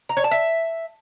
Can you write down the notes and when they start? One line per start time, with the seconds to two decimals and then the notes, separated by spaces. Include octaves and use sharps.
0.09 A#5
0.17 C#5
0.24 A5
0.31 E5